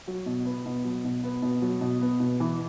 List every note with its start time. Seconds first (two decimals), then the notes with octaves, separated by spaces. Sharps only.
0.07 F#3
0.26 B2
0.45 B3
0.66 B2
0.85 F#3
1.04 B2
1.24 B3
1.42 B2
1.62 F#3
1.81 B2
2.01 B3
2.20 B2
2.40 E3